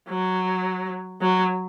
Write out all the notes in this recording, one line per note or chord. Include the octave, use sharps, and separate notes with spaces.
F#3
F#3